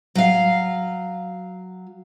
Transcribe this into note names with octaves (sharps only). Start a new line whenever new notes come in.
F#3 F5